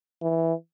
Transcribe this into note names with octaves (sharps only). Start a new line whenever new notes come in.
E3